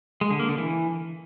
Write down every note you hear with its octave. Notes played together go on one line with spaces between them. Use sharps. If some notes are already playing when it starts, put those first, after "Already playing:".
G#3
D3
A#3
D3
E3